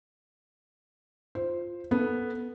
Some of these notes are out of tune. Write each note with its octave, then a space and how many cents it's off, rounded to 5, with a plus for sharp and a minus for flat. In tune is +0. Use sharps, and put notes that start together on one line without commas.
F4 +0 C5 +0
B3 -5 A4 -5